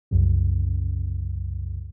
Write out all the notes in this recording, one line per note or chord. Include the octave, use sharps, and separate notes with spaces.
C2 F#2 C#3